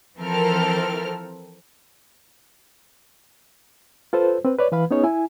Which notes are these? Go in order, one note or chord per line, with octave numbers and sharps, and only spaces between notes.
E3 F3 C4 A4 A#4 F6
F4 A4 B4 C5
C4 B4
B4 C#5 D5
E3 B4 F5 B5
B3 C#4 D#4 G#4 C#5
E4 G#5